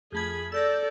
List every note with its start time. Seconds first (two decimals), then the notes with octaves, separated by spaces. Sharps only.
0.12 F2 A3 G#4 B5 G#6
0.52 A4 D5 E6 G6 A#6